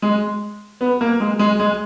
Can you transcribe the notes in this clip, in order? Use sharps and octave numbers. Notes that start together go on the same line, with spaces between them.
G#3
B3
A#3
G#3
G#3
G#3